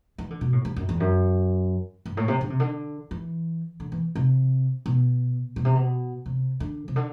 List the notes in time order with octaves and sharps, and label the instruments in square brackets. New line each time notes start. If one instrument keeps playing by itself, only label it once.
[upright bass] E3
D3
B2
A2
G2
F#2
E2
F#2
G2
A2
C3
D3
C3
D3
E3
D3
E3
C3
B2
B2
C3
B2
C3
D3
C3
D3